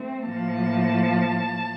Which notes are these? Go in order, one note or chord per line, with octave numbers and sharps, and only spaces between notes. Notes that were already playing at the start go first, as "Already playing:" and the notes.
Already playing: A3 C4
A2 F3 A#3 A5